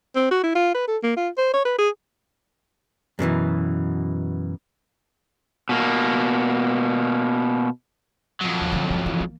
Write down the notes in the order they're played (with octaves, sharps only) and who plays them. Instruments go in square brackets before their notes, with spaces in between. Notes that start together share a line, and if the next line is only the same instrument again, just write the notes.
[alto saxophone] C4
F#4
E4
F4
B4
A4
A#3
F4
C5
C#5
B4
G#4
[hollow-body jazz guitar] F#2 B2 D3 E3
[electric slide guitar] B2 A#3
[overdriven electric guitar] F2 F#3
[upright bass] D#2
D3 F3
C4 C#4
E3
A#3